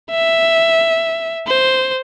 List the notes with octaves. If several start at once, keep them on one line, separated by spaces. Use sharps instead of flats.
E5
C5